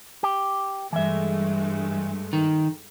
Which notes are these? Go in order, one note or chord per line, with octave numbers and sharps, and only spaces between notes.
G4
G2 E3 G#3 A3 E5
D#3